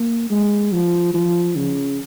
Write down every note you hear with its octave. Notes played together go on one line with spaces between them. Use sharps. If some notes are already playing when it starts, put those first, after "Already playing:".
Already playing: A#3
G#3
F3
F3
C#3